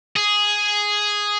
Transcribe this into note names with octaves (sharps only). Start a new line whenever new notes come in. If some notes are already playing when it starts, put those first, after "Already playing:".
G#4